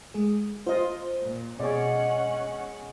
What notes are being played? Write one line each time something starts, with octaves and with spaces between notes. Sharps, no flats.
G#3 G#4
F4 C5 D#5
A#2
B2 G#3 C#4 G#4 C#5 D5 F#5